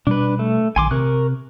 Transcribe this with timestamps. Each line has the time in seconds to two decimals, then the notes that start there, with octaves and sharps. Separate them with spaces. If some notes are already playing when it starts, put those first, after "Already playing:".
0.07 B2 G3 D4 B4
0.39 A3
0.76 A#1 D#3 G#5 C6 D6
0.91 C3 A#4 C#6 F#6